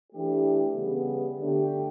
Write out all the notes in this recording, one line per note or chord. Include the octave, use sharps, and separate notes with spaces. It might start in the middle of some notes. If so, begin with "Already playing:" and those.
E3 A3 D4 G4
C#3 G3 B3
D3 A3 D4 G4